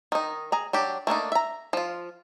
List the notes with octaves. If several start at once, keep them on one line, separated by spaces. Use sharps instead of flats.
D#3 D#4
G#4 A#5
F#3 D4 G4
A3 A#3 D4 D#4
E5 A#5
F3 F4